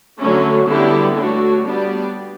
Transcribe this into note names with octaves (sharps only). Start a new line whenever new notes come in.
D3 F#3 A3 C#4
D3 G3 B3 E4 G4
A3 D4 F#4 C#5
G3 B3 D4 G4 D5